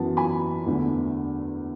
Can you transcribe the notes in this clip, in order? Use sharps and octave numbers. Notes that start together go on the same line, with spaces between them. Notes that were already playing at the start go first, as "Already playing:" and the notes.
Already playing: F#2 E3 B3 A5
G#5 B5
E2 D3 A3